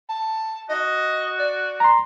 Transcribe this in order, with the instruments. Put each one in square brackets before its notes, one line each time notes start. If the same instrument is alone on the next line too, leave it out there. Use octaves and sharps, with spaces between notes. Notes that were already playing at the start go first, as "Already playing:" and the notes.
[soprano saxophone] A5
[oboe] F#4 [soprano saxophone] D#5
[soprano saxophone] D5
[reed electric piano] A#5 C6